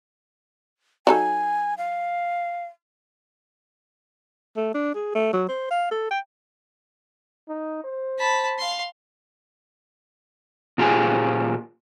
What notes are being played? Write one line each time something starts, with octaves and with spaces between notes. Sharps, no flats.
F#3 D#4 A4 G#5
F5
A3
D4
G#4
A3
F#3
C5
F5
A4
G5
D#4
C5
A5 B5
F5 C6
A#2 F4 G4 G#4 G#5